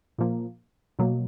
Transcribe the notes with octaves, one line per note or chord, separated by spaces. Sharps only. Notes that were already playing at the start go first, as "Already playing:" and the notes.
A#2 F3 A#3
B2 F#3 A#3